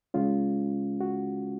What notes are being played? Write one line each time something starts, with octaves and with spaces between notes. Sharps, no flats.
C#2 C#3 G#3 C#4 F4
F#4